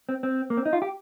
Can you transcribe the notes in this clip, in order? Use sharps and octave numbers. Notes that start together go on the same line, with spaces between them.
C4
C4
A#3
C4
D#4
F4
G4